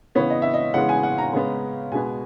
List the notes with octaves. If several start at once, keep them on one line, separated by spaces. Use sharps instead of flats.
C#3 E3 B3 C#5
D#5
E5
D#5
C#3 E3 G#3 B3 F#5
G#5
F#5
A#5
C#3 G#3 B3
B2 G#3 B3 G#5